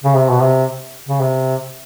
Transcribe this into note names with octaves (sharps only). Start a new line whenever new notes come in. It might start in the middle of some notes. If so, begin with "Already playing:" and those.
C#3
C3
B2
C3
C#3
C3